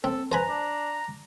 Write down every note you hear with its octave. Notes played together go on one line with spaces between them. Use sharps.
C4 A4
B4 C5 G#5 A#5 B5
D4